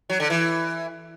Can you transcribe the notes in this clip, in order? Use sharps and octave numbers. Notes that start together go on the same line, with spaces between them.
F#3
D3
E3